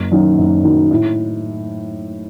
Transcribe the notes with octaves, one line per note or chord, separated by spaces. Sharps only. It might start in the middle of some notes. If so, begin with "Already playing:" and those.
Already playing: F#1
F#2 D#3 F#3
F#1
F#2 D#3 F#3
A2